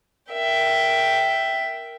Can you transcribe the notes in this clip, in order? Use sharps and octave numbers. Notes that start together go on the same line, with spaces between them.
A#4 E5 G5